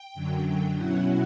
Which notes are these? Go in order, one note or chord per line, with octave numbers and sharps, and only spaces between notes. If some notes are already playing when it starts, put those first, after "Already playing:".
Already playing: G5
F#2 D3 F#3
G5
B2 F#3 C#4 E4 F#5